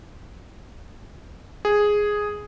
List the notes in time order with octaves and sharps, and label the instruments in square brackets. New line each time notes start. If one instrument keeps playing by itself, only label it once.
[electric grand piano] G#4